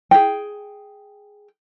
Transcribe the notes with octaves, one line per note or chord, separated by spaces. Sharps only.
G#4 G5